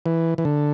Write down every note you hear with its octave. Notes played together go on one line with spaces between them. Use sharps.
E3
E3
D3